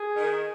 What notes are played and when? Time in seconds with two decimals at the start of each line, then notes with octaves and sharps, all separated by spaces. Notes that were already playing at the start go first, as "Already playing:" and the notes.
Already playing: G#4
0.16 D#3